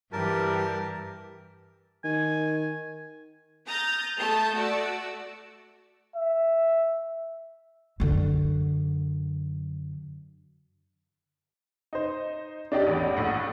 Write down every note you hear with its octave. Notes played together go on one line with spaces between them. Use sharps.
G2 E3 G3 G4 A#4 A5
D#3 G#5
A#5 D#6 F6 G6 A6
A3 A5 D#6 G6
A3 F#4 D5 E6
E5
F#2 D3
D#4 C5
D4 D#4 G4 D5
A1 E2
A#1 A2 F#5